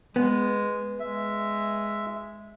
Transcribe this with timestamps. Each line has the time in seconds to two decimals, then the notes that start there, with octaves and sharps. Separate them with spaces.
0.16 G#3 B3
1.00 G#3 E5